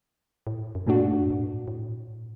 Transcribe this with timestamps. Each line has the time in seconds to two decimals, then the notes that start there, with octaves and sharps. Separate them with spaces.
0.47 A2
0.75 F#2
0.87 G2 A#2 A3 D4 F#4
1.13 G2
1.22 F#2
1.31 G2
1.41 A2
1.68 A2
1.88 A#2
2.08 A2